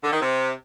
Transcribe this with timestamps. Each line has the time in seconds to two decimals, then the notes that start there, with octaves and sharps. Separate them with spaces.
0.03 D3
0.12 D#3
0.21 C3